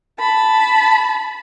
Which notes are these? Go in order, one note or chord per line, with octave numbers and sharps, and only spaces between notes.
A5 B5